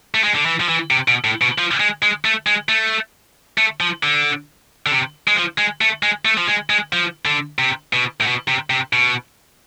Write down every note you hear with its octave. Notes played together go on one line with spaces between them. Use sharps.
A3
G#3
D3
E3
F3
E3
C3
B2
A2
B2
F3
G#3
G#3
A3
G#3
A3
A3
F3
D3
D3
C3
G#3
F3
G#3
A3
G#3
A3
F3
G#3
G#3
F3
D3
C3
B2
A2
B2
C3
C3
B2